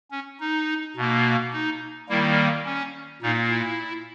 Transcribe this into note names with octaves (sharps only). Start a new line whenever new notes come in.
C#4
D#4
B2 A#3
D#4
D#3 G3 A#3 E4
C#4
A#2 A#3 D#4
E4